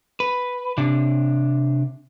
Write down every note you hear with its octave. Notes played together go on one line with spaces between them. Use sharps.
B4
C3 D4